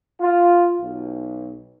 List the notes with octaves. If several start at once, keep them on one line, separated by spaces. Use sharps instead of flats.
F4
B1